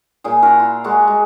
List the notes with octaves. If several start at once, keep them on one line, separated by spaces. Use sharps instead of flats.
A#2 G#4
E4 F#4 A#4
F4
G#3 F#4 A#4 D5
G#3